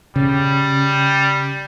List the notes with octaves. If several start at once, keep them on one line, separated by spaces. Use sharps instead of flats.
C#3 G3